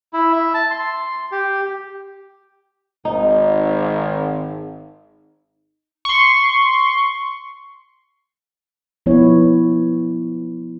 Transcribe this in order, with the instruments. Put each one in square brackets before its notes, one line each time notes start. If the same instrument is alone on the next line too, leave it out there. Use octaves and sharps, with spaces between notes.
[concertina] E4
E5
A5
C6
G4
[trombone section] G#1 [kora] D#4
[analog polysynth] C6 C#6
[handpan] F3 B3 E4 C#5